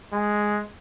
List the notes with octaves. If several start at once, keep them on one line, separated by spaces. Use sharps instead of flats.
G#3